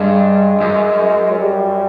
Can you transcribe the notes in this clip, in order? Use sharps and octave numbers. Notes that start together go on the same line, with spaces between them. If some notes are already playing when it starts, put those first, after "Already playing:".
Already playing: G2 G#3
F#2
F#3
G3